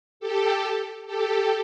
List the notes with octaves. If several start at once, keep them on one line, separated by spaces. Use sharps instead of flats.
G4 A4
G4 A4